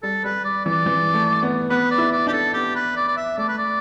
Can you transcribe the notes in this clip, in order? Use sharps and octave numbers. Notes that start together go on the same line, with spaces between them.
G3 A4
G3 B4
D5
E3 D5
E3
A3
B3
B3 B4
D5
E4
D5
D4 G4
A4
B3 G4
B4
D5
D5
E5
A3 D5
B4
D5